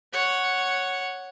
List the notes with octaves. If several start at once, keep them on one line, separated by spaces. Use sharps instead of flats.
C#5 F#5